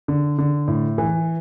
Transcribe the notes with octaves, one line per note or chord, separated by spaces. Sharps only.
D3
D3
A2
E3